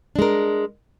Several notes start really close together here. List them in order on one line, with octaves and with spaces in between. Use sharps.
D4 G#3 A#4